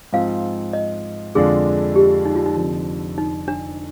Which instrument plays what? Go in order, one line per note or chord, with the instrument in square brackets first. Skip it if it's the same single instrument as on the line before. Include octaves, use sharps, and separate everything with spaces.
[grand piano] G#2 F3 C4 F4 [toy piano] F5
[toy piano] D#5
[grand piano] F2 D3 G#3 D4 F4 [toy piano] G#4
[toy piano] G4
D#4
F4
D#4
[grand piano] F1 F2 D3
[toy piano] D#4
D4